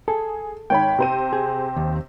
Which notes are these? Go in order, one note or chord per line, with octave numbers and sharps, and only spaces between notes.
G#4 A4
G#1 C#5 G5 B5
C3 C5 D#7
G#4
D#2